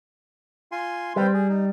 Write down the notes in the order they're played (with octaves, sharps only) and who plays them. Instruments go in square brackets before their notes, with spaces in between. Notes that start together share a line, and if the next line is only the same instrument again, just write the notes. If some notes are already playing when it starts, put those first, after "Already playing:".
[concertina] F4 G#5 C6
[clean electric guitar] G3 [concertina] C4 B4 C5
[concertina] G#4
D#4